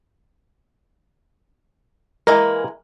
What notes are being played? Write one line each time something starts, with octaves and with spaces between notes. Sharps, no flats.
E3 G#3 A#3 A#4